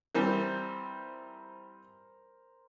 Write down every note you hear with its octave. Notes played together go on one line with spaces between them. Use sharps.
E3 G3 C4 A#4 C5